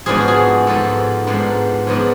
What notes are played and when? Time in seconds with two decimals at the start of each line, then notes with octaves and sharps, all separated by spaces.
0.06 G#2 F3 B3 D4 G#4
0.18 F#4
0.28 G#4
0.67 G#2 F3 B3 D4 A4
1.26 G#2 F3 B3 D4
1.87 G#2 F3 B3 D4